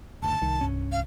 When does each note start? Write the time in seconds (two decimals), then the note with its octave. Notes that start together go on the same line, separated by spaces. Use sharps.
0.22 F#1 D2 A5
0.42 C2 D#3
0.61 G2 C#4
0.92 F5